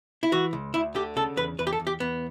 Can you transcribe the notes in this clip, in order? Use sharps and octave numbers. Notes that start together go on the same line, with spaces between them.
E4
E3 F#4
C#2
D2 E4
D3 G4
C#3 A4
E2 B4
E2 B4
G4
A4
E2
G4
E2 B3